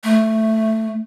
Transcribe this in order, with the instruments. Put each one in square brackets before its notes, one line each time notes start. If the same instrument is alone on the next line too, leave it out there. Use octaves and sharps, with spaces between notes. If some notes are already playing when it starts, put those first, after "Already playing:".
[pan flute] A3